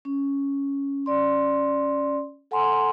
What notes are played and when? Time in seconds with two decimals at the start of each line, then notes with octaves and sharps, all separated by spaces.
0.05 C#4
1.06 C#4 D5 C6
2.51 A4 F#5 G#5 A#5 C6